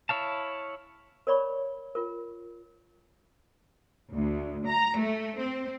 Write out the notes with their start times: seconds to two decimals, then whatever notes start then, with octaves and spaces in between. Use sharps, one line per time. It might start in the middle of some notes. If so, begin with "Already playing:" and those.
0.09 E4 C#5 F5 A5
1.27 A#4 C#5 D5 B5 C#6
1.95 F4 A#4
4.14 D2
4.67 A#5
4.98 A3
5.40 C4